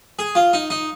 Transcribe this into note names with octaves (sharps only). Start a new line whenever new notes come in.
G#4
F4
D#4
D#4